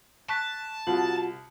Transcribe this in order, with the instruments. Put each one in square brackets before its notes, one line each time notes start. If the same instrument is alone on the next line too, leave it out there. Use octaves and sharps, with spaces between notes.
[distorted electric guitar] A5 [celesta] C#6 F#6 B6
[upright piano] C2 [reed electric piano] F4 F#4 [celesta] F#7